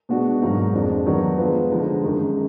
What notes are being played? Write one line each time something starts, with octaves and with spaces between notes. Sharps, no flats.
B2 G#3 D4 F#4
G#2 F#3 A#3 D#4 F#4
F2 F3 G#3 D4
D#3 F#3 B3 D4
F3 G#3 B3 F4
D3 F3 G#3 D#4
F#2 D#3 G#3